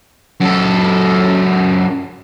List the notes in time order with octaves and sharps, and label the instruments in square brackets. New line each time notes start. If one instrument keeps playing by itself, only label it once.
[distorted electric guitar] F#2 A4